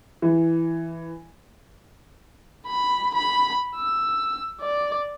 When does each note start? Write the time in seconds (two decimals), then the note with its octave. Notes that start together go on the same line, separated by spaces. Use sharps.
0.22 E3
2.67 B5
3.15 B5
3.76 E6
4.61 D5